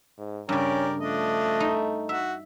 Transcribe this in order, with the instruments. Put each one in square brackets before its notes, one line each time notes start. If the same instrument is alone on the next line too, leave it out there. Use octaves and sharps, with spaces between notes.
[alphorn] G#2
[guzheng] G2 C#3 [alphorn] C#4 [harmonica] G4 A#4 D5
[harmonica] F3 D4 D#5 [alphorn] A3
[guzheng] D#4
[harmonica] F#4 [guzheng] E5